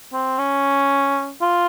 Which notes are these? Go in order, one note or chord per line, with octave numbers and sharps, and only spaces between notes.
C4
C#4
F4